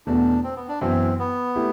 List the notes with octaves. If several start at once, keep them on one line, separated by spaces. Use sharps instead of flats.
E2 B2 A3 D4
C4
B3
D4
F#2 E3 B3 C4 E4
B3
A3 E4 G4